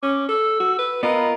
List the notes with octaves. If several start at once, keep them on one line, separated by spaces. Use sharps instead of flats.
C#4 D6
A4 E6
F#4
B4
B3 F4 A#4 D#5 B5